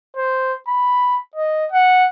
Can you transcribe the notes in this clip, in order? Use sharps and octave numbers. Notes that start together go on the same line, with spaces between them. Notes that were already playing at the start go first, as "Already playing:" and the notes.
C5
B5
D#5
F#5